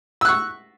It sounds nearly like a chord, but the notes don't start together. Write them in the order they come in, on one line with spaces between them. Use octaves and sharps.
E6 F#6 C#6